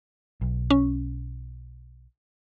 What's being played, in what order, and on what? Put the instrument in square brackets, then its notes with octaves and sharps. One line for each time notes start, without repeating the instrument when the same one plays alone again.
[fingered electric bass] B1
[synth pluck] C#4